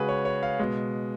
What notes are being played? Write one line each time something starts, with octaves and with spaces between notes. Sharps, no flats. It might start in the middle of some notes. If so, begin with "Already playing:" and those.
Already playing: C#3 G#3 F#4 G#4 B4
C#5
C#5
F5
B2 G#3